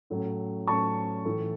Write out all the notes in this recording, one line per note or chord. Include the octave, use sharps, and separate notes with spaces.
A2 F#3 A3 C#4
A2 F#3 A3 C#4 A5 C#6
A2 E3 A3